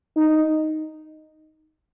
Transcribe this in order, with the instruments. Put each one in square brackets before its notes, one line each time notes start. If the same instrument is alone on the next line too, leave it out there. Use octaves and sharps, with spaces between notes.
[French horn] D#4